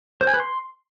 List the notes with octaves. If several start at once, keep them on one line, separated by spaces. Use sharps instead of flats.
C5
G#5
B4
C6